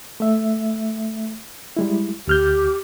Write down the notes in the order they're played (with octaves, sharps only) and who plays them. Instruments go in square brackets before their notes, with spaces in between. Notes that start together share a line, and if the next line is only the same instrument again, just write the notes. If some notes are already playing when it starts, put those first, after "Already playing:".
[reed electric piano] A3 E5
G3 G#3 E4
[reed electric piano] D2 F6 G6 [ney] G4